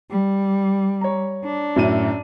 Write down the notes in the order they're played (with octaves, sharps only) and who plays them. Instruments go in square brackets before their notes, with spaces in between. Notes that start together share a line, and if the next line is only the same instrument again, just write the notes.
[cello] G3
[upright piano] C#5 A#5
[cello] D4
[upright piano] F#2 A2 D#7